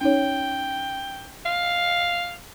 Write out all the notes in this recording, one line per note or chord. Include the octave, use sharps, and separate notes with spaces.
C#4 D#4 C#5 G5
F5